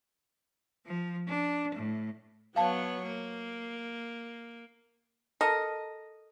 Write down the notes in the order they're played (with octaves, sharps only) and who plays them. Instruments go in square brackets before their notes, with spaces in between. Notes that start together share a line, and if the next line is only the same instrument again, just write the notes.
[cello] F3
D4
A2
[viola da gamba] F#3 B3 C#5 [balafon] F5 A5
[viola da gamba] A#3
[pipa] A4 A#4 D#5